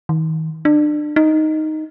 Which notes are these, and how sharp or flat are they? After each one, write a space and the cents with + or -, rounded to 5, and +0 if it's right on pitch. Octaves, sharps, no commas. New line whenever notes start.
D#3 +40
D4 +30
D#4 +0